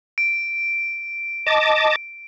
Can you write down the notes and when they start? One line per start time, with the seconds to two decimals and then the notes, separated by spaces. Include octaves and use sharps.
0.18 D7
1.47 D#5 A5 D6